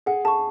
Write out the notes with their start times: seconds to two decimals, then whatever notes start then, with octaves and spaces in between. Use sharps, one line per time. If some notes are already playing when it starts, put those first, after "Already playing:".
0.06 G#4 F#5
0.24 G#4 A5 C#6